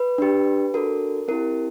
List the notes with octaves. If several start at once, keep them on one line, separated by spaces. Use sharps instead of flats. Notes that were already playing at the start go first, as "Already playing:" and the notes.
Already playing: B4
D4 G4
D4 F#4 A4 A#4
C4 E4 G4 A#4